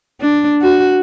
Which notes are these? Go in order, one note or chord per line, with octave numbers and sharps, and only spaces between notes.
D4
F#4